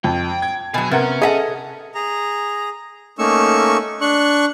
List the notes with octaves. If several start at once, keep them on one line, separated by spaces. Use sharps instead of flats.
F2 G5
G#6
B2 F#3 G#4
C3 B3 C#4 A#4 F#5
G#4 A4 D#5 E5 F#5
G#4 A#5
A3 A#3 C#4 D#4 C#6 E6
D4 C#6 F#6